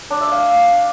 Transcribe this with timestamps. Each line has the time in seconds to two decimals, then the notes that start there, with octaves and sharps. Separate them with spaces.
0.10 D4
0.21 E5
0.31 F5